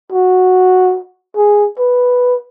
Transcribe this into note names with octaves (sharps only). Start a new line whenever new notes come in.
F#4
G#4
B4